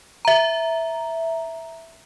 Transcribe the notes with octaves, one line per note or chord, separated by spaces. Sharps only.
E5 A#5